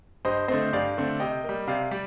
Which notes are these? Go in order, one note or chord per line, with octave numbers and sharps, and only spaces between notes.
G2 C5 D#5
D3 A3 C4 C5 D#5
G2 D5 F5
D3 A3 C4
C3 D#5 G5
G3 A#3
C3 D5 F5
G3 D5